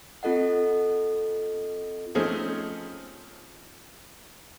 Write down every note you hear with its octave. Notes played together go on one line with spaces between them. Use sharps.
C4 F4 A4 D#5 F#5
F3 A3 C4 C#4 D#4 G#4